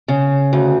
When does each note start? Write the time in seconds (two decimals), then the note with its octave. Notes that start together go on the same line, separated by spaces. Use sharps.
0.08 C#3
0.53 D2